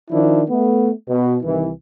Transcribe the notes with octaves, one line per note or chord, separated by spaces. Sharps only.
D#3 F3 D4 E4
A3 B3
B2
C2 D#3 E3